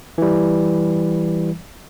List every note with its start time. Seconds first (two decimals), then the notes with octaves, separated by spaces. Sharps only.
0.18 E3 G3